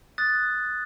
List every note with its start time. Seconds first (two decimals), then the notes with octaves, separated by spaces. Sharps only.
0.18 D#6 F#6 A6